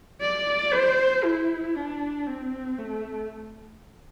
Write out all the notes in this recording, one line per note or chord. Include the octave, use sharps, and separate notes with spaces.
D5
C5
E4
D4
C4
A3